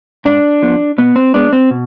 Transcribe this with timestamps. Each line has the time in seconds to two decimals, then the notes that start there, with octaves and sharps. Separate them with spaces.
0.25 G#2 D4
0.62 F3 B3
0.98 B2 B3
1.16 C4
1.34 G#3 B3 D4
1.53 C4
1.71 B2